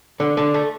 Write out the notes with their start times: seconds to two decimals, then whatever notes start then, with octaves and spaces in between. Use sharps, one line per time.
0.20 D3
0.37 D3
0.54 A3